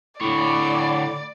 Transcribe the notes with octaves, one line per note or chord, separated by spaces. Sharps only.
A2 D3 C#5 D5 G5 B5 D6